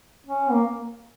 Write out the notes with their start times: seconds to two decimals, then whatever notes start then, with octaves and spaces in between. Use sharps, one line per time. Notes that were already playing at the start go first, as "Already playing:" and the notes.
0.27 C#4
0.51 A#3